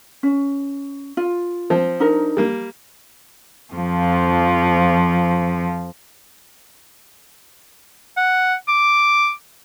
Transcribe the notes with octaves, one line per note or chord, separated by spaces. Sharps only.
C#4
F4
F3 C4
D4 D#4 A#4
G3 A#3
F2 F3
F#5
D6